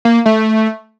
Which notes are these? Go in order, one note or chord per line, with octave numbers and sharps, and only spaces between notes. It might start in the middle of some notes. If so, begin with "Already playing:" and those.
A#3
A3